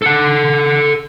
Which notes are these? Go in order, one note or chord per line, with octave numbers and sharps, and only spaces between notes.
A4 F#5